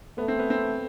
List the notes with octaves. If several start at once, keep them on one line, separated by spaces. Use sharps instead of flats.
A3 B3
C4
B3
C4